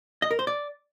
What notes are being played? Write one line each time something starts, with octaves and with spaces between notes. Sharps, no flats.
D#5
A#4
C5
D5